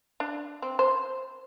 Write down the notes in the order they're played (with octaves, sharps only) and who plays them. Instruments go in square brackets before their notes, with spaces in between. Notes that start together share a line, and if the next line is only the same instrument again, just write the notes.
[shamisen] D4
C4
C5